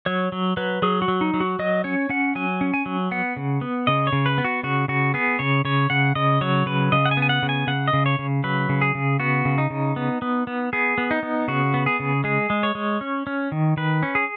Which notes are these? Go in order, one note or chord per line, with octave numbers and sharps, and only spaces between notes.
F#3 C#5
F#3
F#3 B4
F#3 G#4
F#4
F#3
D#4
F#3
F#4
F#3 D#5
C#4 C#5
C#4 F#5
F#3 G#5
C#4
G#5
F#3
B3 F#5
C#3
B3
C#3 D#5
C#5
C#3
B4
B3
F#4
C#3 F#4
C#3 F#4
B3 G#4
C#3 C#5
C#3 C#5
C#3 F#5
C#3 D#5
F#3 C#5
C#3 B4
C#3 D#5
F#5
G#5
B3
G#5
F#5
C#3
G#5
C#3 F#5
D#5
C#3
C#5
C#3
F#3 B4
C#3
G#4
C#3
B3 F#4
C#3
D#4
C#3
B3
B3
B3
B3 G#4
B3
D#4
B3
C#3 F#4
B3
G#4
C#3
G#3 G#4
G#3
C#5
G#3
C#4
C#4
D#3
D#3 B4
C#4
G#4